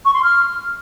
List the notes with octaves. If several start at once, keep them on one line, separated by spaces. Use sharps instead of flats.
C#6
C6
F6